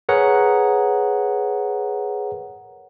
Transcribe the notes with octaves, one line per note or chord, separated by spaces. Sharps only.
G#4 A#4 B4 C#5 F#5 A#5